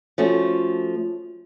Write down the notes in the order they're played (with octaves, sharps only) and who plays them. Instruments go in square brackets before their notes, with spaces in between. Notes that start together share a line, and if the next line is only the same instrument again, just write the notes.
[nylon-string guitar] F3 A3 C#4 F#4